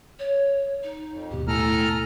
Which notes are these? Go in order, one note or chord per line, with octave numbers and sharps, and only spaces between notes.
C#5
D#4
F2
D#2 G#2 B2 G4
A2 A4 G#5 A#5 F6